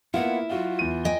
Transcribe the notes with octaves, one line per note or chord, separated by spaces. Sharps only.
A#3 B3 E4 F4 F#5
F#3 F4 F#4 F5
E2 D#7
D#5 G5 G#5